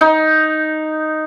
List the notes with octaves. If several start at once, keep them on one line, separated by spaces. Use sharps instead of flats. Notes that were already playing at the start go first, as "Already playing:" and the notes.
D#4